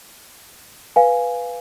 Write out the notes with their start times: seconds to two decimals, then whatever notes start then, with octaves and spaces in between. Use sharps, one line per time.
0.96 B4 F5 G#5